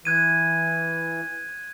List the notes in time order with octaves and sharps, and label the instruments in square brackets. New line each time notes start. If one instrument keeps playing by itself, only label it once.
[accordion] E3 [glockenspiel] F#6 G#6 D#7